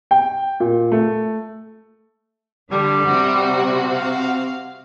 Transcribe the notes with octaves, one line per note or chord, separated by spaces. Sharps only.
G5
A#2
A3
D3 G3
C3 C4 F#4
F5